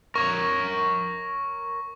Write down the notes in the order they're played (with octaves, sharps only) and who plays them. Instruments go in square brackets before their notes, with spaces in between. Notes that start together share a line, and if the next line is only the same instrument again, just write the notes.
[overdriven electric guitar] A#4 C#5 [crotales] C#6